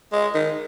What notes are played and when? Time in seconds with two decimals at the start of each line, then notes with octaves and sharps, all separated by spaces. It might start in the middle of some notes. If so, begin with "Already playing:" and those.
0.12 G#3
0.34 D#3